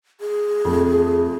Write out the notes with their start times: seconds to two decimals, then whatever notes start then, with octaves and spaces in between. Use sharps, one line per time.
0.21 G#4
0.65 F2 A3